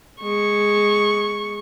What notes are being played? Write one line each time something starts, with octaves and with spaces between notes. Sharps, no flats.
G#3 C#6